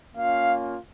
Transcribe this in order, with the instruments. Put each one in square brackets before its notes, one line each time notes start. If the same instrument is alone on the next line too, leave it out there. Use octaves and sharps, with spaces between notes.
[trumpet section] A#3 C#4 F4 F5